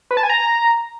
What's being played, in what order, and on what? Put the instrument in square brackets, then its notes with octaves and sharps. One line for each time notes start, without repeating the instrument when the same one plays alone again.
[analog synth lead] B4
A5
G#5
A#5